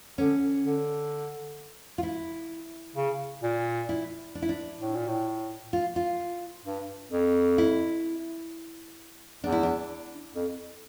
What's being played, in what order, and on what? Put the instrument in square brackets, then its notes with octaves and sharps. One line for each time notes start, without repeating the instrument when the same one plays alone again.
[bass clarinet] D3 [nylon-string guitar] C#4
[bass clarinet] D3
[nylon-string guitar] F4
E4
[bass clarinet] C#3
A#2
[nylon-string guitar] E4
D4
E4
D4
[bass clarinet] A2
A#2
A2
[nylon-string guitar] F4
F4
[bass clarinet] G2
F2
[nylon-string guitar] E4
[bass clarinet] E2 [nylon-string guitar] D4
[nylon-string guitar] E4
D4
[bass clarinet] F2